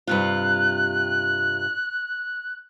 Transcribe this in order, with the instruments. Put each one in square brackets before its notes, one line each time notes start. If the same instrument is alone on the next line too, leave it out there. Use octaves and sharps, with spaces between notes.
[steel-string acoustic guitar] G2 C3 F4 [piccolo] F#6